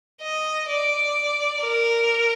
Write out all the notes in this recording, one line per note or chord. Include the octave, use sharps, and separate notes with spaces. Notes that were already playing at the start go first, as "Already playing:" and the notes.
D#5
D5
A#4